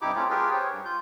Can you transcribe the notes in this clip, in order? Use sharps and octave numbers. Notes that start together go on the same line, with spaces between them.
G2 C3 D#4 E4 G4 D6
A3 C4 C#4 E4 F4
F4 G4 G#4 A#4 B4 G5
C5 C#5
G2
F4 G6